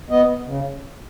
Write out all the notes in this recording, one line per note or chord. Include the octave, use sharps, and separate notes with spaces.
B3 D#5
C#3